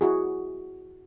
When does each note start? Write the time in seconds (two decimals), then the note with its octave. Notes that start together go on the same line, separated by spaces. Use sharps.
0.01 E4 F#4 G#4